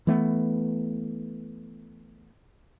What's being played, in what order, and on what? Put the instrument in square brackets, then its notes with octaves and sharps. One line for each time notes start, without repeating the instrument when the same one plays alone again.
[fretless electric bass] E3 A3 B3